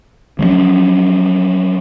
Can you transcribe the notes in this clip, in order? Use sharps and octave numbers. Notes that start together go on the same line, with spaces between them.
F3 F#3 A3 C#4